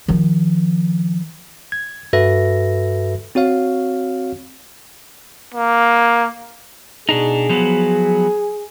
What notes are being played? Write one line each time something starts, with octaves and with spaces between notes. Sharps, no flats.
D#3 F3
G#6
G2 F#4 A4 B4 E5 A#6
C4 F#4 C#5 F5
A#3
B2 D4 D#4 G#4
F3 F#3 B3